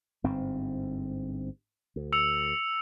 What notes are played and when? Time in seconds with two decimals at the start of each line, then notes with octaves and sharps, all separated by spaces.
0.24 G1 G#2 C4
1.96 D2
2.13 E6 C#7 F7